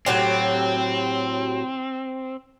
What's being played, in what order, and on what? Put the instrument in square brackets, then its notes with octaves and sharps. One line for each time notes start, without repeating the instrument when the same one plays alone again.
[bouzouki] A2 F#3 G4 [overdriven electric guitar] C4